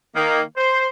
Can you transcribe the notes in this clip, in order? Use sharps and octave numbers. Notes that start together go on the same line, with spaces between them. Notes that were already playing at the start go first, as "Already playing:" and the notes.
D#3 A#3
C5